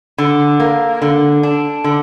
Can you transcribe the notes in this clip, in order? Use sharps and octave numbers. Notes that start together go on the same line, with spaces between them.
D3
A#3
D3
D4
D3